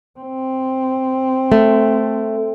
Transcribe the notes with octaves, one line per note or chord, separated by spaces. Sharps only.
C4
A3